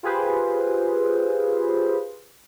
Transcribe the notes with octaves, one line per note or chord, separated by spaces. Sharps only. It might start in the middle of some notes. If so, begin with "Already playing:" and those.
F4 G4 G#4 B4 C5